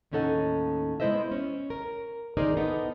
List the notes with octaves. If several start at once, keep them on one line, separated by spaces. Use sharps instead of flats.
D#2 A2 C#4 D#4 A4 F#5
G#3 B3 E4 C5 D#5 E5
C#4
A#4
D#3 D#4 G#4 A#4 C5 D5
B3 D#4 A4